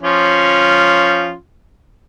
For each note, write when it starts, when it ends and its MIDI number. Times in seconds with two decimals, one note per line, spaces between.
0.03 1.33 53
0.03 1.33 61
0.03 1.33 65